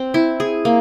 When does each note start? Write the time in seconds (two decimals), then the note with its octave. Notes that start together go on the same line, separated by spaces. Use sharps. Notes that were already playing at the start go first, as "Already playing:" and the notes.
Already playing: C4
0.14 E4
0.40 G#4
0.65 A#3